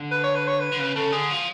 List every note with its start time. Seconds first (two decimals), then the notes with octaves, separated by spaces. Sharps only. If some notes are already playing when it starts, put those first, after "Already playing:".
Already playing: D3
0.11 B4
0.24 C#5
0.35 B4
0.47 C#5
0.60 B4
0.72 D3
0.79 C#3 B4
0.96 C#3 A4
1.12 D3 G#4
1.30 F3